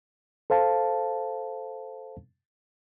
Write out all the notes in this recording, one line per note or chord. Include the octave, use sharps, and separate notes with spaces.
A4 C5 F5 A5